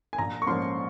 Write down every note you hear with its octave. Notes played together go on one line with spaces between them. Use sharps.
G#5
A#1 A#5
C#6
G#2 F3 A#3 C#4 C6